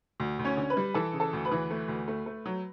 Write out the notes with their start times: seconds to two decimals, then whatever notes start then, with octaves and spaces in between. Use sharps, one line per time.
0.20 D2
0.39 D2
0.45 C#4 C#5
0.57 D3
0.70 B4 B5
0.77 G3
0.94 E3 A4 A5
1.13 C#3
1.20 A4 A5
1.33 D2
1.45 B4 B5
1.52 E3
1.71 A3
1.88 D2
2.08 A3
2.26 A3
2.46 F#3